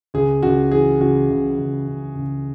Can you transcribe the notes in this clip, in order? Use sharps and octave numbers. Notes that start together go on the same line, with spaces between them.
C#2 G#4
C#2 F#4
E3 G#4
C#3 F#4
C#2
C#2
C#2
C#2